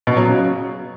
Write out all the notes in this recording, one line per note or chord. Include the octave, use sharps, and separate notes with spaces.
B2
F#3
C#3